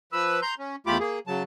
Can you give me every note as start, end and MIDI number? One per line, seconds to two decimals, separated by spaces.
0.12 0.40 53
0.12 0.40 71
0.12 0.40 88
0.42 0.54 82
0.42 0.54 84
0.42 0.54 91
0.59 0.76 61
0.87 0.98 40
0.87 0.98 57
0.87 0.98 65
0.87 0.98 67
0.87 0.98 83
0.87 0.98 86
1.00 1.19 58
1.00 1.19 68
1.27 1.43 49
1.27 1.43 54
1.27 1.43 81